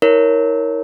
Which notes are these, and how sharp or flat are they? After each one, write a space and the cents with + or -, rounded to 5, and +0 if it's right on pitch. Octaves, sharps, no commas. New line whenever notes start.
E4 -45 A#4 +0 C#5 +0